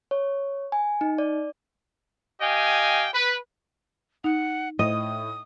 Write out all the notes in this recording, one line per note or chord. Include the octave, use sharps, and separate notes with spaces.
C#5
G#5
D#4
D5
G4 D#5 F5 G5 G#5
B4
D#4 F#5
A2 D#5 D#6